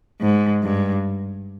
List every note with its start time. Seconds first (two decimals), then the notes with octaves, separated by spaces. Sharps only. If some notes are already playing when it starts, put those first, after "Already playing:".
0.21 G#2
0.63 G2